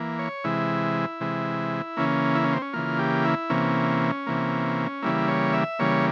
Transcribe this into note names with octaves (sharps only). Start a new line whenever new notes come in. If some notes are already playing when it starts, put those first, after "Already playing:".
Already playing: E3 A#3
C#5
C3 E3 G#3 E4
C3 E3 G#3
C#3 E3 A#3 C#4
E4
C#4
C4
C#4
C#3 E3 A#3 F4
G4
E4
C3 E3 A#3 C#4
C3 E3 A#3
C#3 E3 G3 A#3 E4
C#5
E5
C#3 E3 G3 A#3 C#5